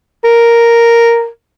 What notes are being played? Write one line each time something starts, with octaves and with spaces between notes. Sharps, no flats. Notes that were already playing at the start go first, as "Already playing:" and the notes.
A#4